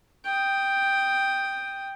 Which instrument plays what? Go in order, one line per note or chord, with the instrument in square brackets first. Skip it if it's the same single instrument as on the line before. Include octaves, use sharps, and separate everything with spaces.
[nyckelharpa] G5 D#6